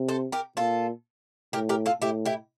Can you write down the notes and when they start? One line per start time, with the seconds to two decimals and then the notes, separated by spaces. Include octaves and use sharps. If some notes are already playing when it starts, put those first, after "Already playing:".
Already playing: C3
0.08 A4 C5
0.32 G4 A#4
0.57 A#2 F4 A4
1.53 A2 G4 A#4
1.69 G4 A#4
1.86 F4 A4
2.01 A2 E4 G4
2.25 E4 G4